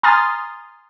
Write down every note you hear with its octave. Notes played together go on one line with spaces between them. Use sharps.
G#5 A#5 C6 D#6 F6 A6